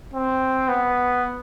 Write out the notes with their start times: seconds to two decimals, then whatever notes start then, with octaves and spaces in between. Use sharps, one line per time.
0.14 C4
0.68 B3